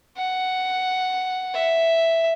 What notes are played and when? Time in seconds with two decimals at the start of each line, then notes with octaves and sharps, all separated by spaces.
0.17 F#5
1.54 E5